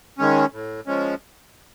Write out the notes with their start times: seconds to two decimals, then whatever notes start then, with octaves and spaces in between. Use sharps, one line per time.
0.18 D#3 G#3 C#4
0.53 A2
0.87 F3 G#3 C#4